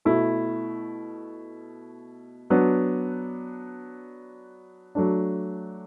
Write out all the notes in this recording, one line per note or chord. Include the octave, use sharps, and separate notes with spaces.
B2 A3 E4
F#3 B3 D4
F#3 A3 D4